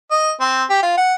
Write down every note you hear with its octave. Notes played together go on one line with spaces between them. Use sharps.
D#5
C4
G4
F4
F#5